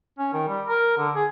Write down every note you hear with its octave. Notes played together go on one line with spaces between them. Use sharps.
C#4
D#3
G3
A#4
D3
G#4